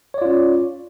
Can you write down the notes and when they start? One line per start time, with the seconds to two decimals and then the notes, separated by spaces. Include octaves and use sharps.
0.14 C#5
0.18 D5
0.22 F4
0.25 C#4